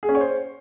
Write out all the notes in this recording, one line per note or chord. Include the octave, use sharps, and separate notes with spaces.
G#4
C#4
C#5
C5